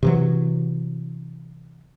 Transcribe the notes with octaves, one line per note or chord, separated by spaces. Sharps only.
C3 E3 F#3